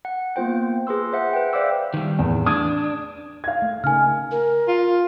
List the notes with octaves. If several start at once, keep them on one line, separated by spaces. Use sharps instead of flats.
F#5
A#3 B3 F4 C5 G5
G#4 B4 C6 E6
C5 E5 F#5
B4 G5
C5 D5 E5 F5 D6 E6
D#3 G3
E2 A2
D4 D#6 G#6
F5 G#6
A3
C#3 D#4 A#4 G#5 F6
A#4
F4